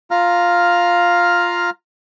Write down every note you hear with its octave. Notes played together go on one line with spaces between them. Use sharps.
F4 F5 A#5 F6